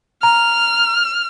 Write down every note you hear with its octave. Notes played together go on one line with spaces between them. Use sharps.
A#5 F6